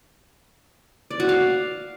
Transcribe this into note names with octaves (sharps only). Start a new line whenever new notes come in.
D5
F#4
F5